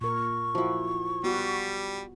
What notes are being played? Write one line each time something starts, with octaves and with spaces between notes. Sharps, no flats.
A#2 A#4 C#6
F3 E4 F#4
G3 B3 F#4